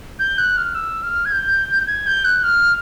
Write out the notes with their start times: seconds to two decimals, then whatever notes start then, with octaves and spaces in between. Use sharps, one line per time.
0.19 G6
0.38 F#6
0.57 F6
0.75 E6
1.03 F6
1.25 G#6
1.32 G6
1.87 G#6
2.07 G6
2.25 F#6
2.43 F6